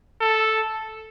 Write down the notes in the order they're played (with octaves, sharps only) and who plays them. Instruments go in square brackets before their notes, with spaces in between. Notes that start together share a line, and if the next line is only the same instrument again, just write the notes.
[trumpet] A4